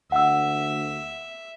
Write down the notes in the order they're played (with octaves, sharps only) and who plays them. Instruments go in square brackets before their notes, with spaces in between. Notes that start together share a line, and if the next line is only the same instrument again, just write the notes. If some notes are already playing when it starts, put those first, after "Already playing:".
[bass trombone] D2 [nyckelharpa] E5 [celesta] F#5 E6